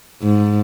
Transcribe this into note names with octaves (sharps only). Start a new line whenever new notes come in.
G#2